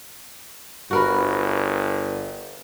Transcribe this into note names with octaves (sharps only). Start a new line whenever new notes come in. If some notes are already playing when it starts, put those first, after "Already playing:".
G1 F#4 A#4 B4